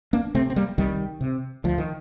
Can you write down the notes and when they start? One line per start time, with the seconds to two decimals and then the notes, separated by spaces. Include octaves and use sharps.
0.13 A#3 D4
0.34 C3 A3 C4
0.50 C4
0.56 G3 A#3
0.78 C2 D#3 G3
1.21 C3
1.64 D2 F3
1.78 D#3